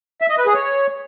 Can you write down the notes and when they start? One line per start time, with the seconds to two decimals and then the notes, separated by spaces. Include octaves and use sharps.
0.21 E5
0.30 D#5
0.38 B4
0.46 G#4
0.54 C#5